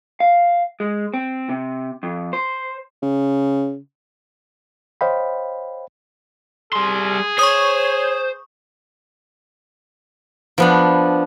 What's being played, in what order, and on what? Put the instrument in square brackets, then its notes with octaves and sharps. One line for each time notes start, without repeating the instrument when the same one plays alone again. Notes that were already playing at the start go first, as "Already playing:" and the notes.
[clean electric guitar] F5
G#3
C4
C3
F2
C5
[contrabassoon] C#3
[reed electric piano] C5 C#5 D#5 F5 G5 B5
[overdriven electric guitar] G3 C6 [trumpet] G#4
[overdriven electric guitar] C5 [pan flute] C#5 [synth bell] C#6 D#6
[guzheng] F3 B3 D4